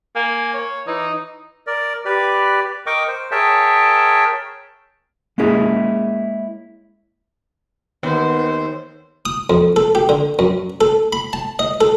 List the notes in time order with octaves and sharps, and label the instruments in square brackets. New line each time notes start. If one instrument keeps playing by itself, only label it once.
[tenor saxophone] A#3 [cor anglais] G#5
[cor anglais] C#5
[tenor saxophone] E3 [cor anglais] D#4
[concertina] A#4 D5
G4 B4 D5
A#4 D#5 G5 C#6 D6
C5
G#4 A#4 C#5 E5 G5 A5
[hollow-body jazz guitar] G#3 A#3 C#4 E4 G#4
[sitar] D#2 [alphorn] B3 [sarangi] C5
[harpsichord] D#6
F2
A4
G4
D3
F#2
A4
B5
A5
D#5
A4